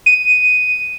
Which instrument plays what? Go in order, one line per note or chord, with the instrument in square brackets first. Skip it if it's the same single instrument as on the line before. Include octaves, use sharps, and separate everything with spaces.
[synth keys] D#7